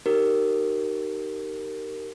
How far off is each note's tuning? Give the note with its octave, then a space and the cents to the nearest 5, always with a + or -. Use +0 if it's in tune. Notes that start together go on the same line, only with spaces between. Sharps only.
D#4 +0 G4 -20 A#4 -10